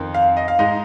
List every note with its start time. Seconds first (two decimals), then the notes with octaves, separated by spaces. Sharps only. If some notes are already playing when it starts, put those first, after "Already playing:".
Already playing: F2 D#3 C4
0.14 F5
0.37 D#5
0.48 F5
0.59 G#2 G#3 D#4 D#5